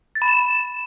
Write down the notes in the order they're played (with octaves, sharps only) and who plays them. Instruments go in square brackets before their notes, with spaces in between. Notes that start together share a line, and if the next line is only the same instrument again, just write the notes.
[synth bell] A6
B5
E7